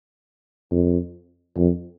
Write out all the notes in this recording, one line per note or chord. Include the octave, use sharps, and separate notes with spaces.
F2
F2